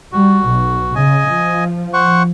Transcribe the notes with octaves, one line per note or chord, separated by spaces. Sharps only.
G3 F#4
B1
C#3 D#5 G#5
F3
C5 F#5 C#6